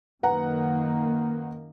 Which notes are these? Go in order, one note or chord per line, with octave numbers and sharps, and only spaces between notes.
F#2 D#3 A#3 B4 F#5 A#5